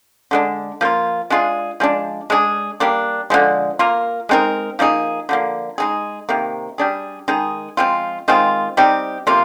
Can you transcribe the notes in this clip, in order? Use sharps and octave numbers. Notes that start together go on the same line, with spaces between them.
D3 G#3 D4
F3 A#3 F4
G#3 D4 F4 G#4
F3 G#3 D4
G#3 D4 G#4
G3 A#3 D4
D3 F3 G#3
A#3 F4 A#4
G#3 C4 D#4 A#4
F3 A#3 D#4 G#4
D3 F3 A#3
G#3 D#4 G#4
C3 D#3 A#3
G3 D4 G#4
D#3 G#3 D#4 G#4
F3 G#3 C4 F4
D#3 G#3 C4 F4
G3 C4 D#4 G4
C3 F3 A#3 F4